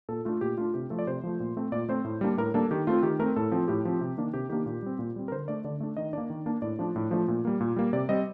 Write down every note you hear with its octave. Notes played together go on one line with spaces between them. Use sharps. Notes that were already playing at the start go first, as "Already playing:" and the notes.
A#2 A4
A3 D4 F4
A#2 G4
A3 D4 F4
C3 G4
F3 A3 A4
D5
C3 C5
F3 A3
A#2
A3 C4
A#2 D5
A3 C4 C5
A2
G3 A#3 D4
A2 A#4
G3 A#3 D4 A4
D#3 G4
A3 C4 F4
D#3 G4
A3 C4 A#4
A2 A4
F3 C4
A2 G4
F3 C4
C3
D#3 A#3 D4
C3 G4
D#3 A#3 D4 G4
A#2
G3 C4
A#2
G3 C4
A#4
D3 C5
A3 D4 D5
D3 D5
A3 D4
D#3 D#5
A#3 D4 D5
D#3
A#3 D4
A2 D5
F3 A3 D4
A2
F3 A3 D4
A#2
G3 A#3
A#2
G3 A#3
C3 D5
G3 C4 D#5